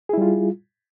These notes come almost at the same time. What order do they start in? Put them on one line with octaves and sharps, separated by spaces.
G#4 E4 G3 F4